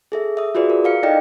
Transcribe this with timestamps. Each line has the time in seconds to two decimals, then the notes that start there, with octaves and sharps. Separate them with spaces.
0.12 G#4 A4 E5
0.37 E5 D#6
0.55 F4 F#4 G#4 B4 D5
0.70 A#4
0.84 A#4 F5 C#7
1.03 D#4 E4 A4 D5 D#5 G5